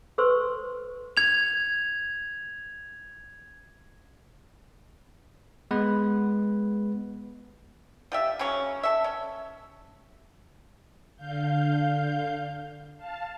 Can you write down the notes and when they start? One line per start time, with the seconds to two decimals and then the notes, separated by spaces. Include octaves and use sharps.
0.18 A4 B4 C5 C6 C#6 E6
1.17 G#6 F7
5.71 G#3 B3 B4
8.12 F3 G4 E5
8.39 C#3 F#3 C#4
8.83 A4 E5
9.04 C#4
11.16 D3 F5 G6
12.98 F5 A5